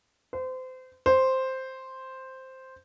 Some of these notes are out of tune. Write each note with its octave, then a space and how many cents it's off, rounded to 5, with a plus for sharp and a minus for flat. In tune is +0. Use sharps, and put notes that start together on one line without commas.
C5 -30
C5 +0